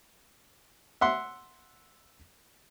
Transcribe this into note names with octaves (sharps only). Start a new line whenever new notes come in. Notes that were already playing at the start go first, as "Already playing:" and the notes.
E5 F#5 C6